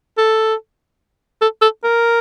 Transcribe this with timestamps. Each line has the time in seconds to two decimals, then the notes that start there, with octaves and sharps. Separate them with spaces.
0.18 A4
1.41 A4
1.62 A4
1.83 A#4